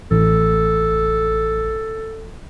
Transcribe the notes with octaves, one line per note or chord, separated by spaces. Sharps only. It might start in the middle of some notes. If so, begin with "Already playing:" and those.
A1 A4